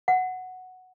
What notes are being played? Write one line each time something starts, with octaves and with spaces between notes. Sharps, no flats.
F#5